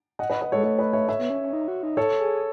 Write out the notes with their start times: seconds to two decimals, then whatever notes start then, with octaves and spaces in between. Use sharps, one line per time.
0.19 D#5 F#5
0.30 B4 D#5
0.41 B4 D#5
0.52 G#3 A4 C#5
0.63 A3 A4 C#5
0.79 B4 D#5
0.93 C#5 E5
1.08 C#5 E5
1.19 B3
1.30 C#4
1.41 C#4
1.53 D#4
1.68 F#4
1.83 D#4
1.97 A4 C#5
2.19 G#4